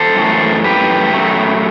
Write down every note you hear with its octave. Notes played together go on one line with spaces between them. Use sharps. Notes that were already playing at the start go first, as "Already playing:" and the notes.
Already playing: A4 C5
F#2 E3 A3
G4 B4
F#2 F#3 A3